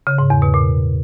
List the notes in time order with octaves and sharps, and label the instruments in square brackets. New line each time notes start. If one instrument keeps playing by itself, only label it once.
[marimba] C#3
G#2
E2
B2
A#2